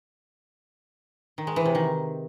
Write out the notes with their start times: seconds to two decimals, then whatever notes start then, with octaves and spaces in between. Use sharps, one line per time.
1.38 D#3
1.47 G#3
1.56 E3
1.66 C3
1.75 D#3